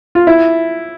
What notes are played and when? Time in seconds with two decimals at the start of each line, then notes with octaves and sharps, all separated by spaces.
0.15 F4
0.27 E4